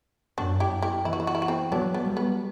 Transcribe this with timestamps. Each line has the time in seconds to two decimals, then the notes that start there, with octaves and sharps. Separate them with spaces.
0.38 F#2 D4 F#4
0.60 E4 G4
0.82 E4 G4
1.05 E3 E4
1.13 F#4
1.20 E4
1.27 F#4
1.35 E4
1.42 F#4
1.48 C4 E4
1.72 F#3 B3 D4
1.94 B3
2.06 G3
2.17 B3